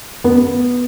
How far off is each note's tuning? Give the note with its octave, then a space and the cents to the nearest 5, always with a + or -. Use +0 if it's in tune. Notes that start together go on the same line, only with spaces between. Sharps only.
B3 -5